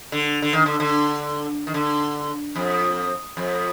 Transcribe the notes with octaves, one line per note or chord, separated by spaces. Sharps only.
D3
D3
D#3
D3
D3
D#3
D3
F2
F2